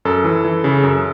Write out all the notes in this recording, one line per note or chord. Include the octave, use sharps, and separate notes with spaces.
F#2 A4
E3
E3
C#3
F#2